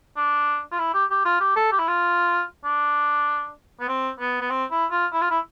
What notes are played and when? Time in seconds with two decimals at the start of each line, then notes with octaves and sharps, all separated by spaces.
0.17 D4
0.72 F4
0.79 E4
0.94 G4
1.10 G4
1.25 F4
1.40 G4
1.56 A4
1.72 G4
1.79 E4
1.88 F4
2.64 D4
3.80 B3
3.88 C4
4.20 B3
4.41 B3
4.50 C4
4.71 E4
4.91 F4
5.13 E4
5.21 F4
5.30 E4